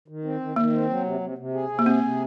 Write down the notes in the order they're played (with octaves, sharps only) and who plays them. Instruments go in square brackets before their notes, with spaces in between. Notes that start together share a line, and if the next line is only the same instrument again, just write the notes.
[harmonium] D#3
C4
D#3
[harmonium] D#3 [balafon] A#3
[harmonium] C4
F#3
C3
C3
C3
G#4
C3
[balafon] A#3
[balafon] C4 [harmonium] G#4
[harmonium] C3